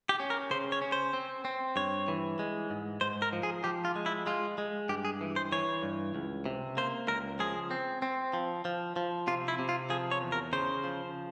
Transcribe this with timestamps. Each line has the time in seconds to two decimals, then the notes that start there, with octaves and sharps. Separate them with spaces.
0.09 G4
0.20 C#4
0.30 A#4
0.51 C#3 C5
0.72 C#5
0.82 C#4
0.92 C5
1.13 C4
1.45 C4
1.76 G2 C#5
2.08 E3
2.39 G#3
2.70 G#2
3.01 G#2 C5
3.22 A#4
3.33 F3
3.43 G#4
3.64 F3 G4
3.85 F4
3.96 G#3
4.06 E4
4.26 G#3 F4
4.58 G#3
4.89 G2 G4
5.05 G#4
5.21 E3
5.36 C5
5.52 E3 C#5
5.83 G2
6.15 C#2
6.46 C3
6.77 A#3 C5
7.08 C#2 A#4
7.39 F3 G#4
7.71 C4
8.02 C4
8.33 F3
8.65 F3
8.96 F3
9.27 C3 F4
9.48 E4
9.59 C3
9.69 F4
9.90 F3 G#4
10.11 C#5
10.21 E2
10.32 A#4
10.53 C#3 C5
10.84 F3